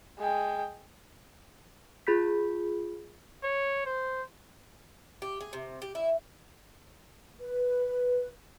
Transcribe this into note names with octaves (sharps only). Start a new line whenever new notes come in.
G#3 G5
F4 G#4 B5 G6 B6
C#5
C5
G4
G#4
C3
G4
E4
B4